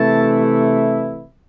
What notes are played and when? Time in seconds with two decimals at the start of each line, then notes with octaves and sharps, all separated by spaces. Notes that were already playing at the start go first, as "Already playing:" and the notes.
Already playing: C3 E3 A3 E4 A5